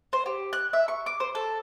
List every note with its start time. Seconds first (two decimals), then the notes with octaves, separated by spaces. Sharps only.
0.13 C5
0.26 G4
0.53 F#6
0.73 E5
0.88 C#6
1.06 D6
1.20 C5
1.35 A4